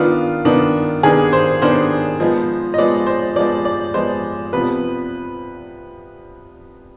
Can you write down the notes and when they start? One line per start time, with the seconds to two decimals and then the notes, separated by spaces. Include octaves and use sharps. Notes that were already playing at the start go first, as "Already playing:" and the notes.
Already playing: D#3 B3 D4 F4
0.45 D#3 B3 D4
1.03 D#3 B3 D4 G#4
1.33 C5
1.62 D#3 B3 D4 C5
2.20 F3 G#3 B3
2.74 D#5
2.78 F3 G#3 B3 D5
3.07 C5
3.36 F3 G#3 B3 D5
3.65 D5
3.94 F3 G#3 B3 C5
4.53 C3 F3 B3 B4